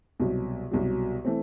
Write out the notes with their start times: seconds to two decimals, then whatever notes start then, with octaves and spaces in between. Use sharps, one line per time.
0.20 C2 B2 F#3
0.71 C2 B2 F#3
1.25 E3 A3 C4